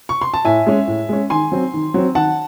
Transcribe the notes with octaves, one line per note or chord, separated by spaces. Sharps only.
C#6
C6
A5
A2 E5 G#5
G#3 C#4
A2
G#3 C#4
D#3 G#5 C6
F#3 C4
D#3
F#3 C4
D#3 F#5 A5